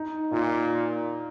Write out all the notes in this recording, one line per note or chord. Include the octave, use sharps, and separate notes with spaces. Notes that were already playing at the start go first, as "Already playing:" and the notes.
Already playing: D#4
A#2 F4